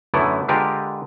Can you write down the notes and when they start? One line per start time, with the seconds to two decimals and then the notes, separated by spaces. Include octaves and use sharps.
0.14 F#2 D3 A3 B3 E4
0.48 D3 G#3 F4 G4 A#4 B4